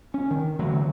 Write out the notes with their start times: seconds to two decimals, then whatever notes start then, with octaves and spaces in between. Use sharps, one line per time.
0.14 C#4
0.31 D#3
0.59 D3 E3 F#3 A3